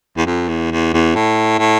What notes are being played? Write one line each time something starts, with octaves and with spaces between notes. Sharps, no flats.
E2
F2
E2
E2
E2
A2
A2